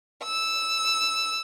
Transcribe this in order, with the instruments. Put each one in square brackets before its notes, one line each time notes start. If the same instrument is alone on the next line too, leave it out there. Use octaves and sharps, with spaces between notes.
[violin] E6